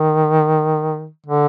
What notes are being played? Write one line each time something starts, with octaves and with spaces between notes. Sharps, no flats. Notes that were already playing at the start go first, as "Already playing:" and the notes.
Already playing: D#3
D3